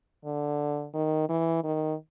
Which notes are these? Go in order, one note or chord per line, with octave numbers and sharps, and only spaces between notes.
D3
D#3
E3
D#3